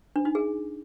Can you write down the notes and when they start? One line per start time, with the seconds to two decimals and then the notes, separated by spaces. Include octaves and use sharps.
0.16 D4
0.25 D#4
0.35 G#4